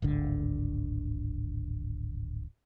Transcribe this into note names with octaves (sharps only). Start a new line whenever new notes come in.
D1 G#1 D3